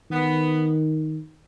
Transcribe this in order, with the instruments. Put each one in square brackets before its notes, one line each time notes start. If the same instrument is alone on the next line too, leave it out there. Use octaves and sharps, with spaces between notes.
[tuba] D#3 [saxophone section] B3